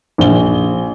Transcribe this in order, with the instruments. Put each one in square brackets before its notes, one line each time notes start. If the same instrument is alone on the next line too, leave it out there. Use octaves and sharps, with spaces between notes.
[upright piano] A#1 G7